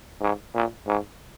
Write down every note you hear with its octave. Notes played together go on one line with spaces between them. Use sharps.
G#2
A#2
G#2